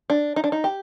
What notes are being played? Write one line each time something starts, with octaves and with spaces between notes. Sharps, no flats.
D4
D#4
D4
D#4
G4